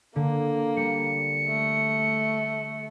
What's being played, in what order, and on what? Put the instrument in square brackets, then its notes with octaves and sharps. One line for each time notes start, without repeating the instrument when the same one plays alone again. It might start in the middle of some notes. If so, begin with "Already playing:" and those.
[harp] D3 [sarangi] A#3
[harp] G3 [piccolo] C#7
[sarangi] A3